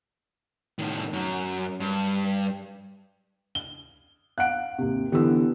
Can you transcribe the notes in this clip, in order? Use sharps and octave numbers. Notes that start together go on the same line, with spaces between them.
A2 D#3
F#2
G2
G7
F5 F#5 F#6 D7
D#2 C3
D3 E3 B3 G4 E6